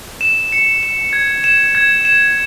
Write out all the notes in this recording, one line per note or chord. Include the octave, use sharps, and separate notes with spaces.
E7
C#7
E7
G#6
E7
G#6
E7